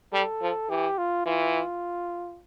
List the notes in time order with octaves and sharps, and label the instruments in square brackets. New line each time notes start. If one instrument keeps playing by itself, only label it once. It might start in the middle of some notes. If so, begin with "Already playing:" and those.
[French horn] G3 [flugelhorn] A4
[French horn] F3
[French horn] E3 [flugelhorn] G4
[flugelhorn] F4
[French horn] E3 [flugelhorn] F4